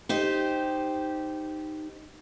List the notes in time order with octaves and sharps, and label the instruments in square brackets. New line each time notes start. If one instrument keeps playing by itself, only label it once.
[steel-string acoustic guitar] D#4 G4 C5